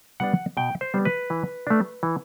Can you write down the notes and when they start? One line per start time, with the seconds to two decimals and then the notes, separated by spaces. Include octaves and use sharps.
0.20 G3 B3 D4 F#5
0.57 B2 G5
0.81 C5
0.94 G3 B3 D4
1.05 B4
1.30 E3
1.67 A3 D4
2.03 E3